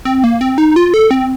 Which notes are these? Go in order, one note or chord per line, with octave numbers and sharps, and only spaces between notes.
C4
A#3
C4
D#4
F4
A4
C4